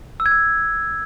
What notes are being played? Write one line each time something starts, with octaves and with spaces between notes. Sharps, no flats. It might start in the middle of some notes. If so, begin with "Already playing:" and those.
E6
G#6
E6